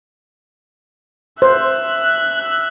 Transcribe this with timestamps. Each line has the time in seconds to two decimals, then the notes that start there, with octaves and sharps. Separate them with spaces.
1.42 C5 E5 F#6